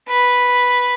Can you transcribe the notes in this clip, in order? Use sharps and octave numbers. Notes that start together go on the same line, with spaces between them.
B4